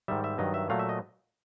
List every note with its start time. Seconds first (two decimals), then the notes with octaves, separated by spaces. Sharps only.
0.08 G#2 D#3 G3 E5
0.24 E5
0.38 G2 D#3 F#3 D#5
0.54 E5
0.69 A#2 F#3 A3 F5
0.79 E5
0.89 D#5